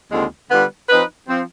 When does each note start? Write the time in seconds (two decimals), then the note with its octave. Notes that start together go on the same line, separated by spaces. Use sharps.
0.11 D#2 D3 G#3 C4 F4
0.50 D3 G3 B3 F4 B4
0.89 F3 C4 D#4 B4
1.28 F3 C4